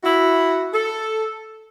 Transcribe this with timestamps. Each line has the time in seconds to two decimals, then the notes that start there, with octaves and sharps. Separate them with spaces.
0.03 E4 F#4
0.73 A4